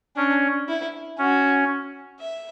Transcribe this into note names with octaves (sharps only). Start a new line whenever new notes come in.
C#4 D4
E4
C#4 F#4
E5